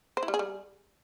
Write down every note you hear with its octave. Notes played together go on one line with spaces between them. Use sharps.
C5
E4
G3
G#4
G3